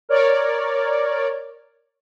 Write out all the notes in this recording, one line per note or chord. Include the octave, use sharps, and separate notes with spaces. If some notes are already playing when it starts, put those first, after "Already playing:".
A#4 C#5 D5